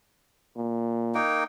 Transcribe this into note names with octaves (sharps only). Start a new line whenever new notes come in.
A#2
A#3 D#4 G5